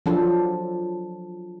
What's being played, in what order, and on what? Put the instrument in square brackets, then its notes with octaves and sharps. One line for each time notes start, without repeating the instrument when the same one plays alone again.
[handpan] F3 F#3 D4 A4